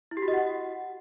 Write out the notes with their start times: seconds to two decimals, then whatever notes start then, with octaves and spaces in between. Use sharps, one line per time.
0.11 E4
0.17 G4
0.22 F#4
0.28 D#5
0.33 F#5